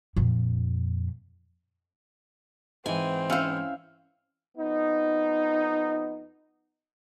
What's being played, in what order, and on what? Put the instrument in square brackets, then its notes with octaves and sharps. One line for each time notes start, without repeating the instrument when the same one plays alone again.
[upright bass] F2 A#2
[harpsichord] G#2 E3 [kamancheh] C4 [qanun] G#5
[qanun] C#4 C5 [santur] E4 E5 F5
[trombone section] F2 B3 D#4